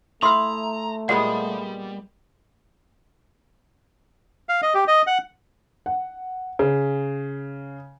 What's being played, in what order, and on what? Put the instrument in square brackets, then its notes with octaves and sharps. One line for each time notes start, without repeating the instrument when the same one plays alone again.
[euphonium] A3 [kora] E4 F5 [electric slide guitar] A#5 [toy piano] C6 D#6
[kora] A#2 G#3 B3 [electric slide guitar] G3 [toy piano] F#5
[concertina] F5
D#5
G4
D#5
F#5
[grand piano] F#5
C#3